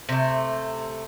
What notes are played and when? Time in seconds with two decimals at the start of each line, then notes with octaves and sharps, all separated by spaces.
0.09 C3 A3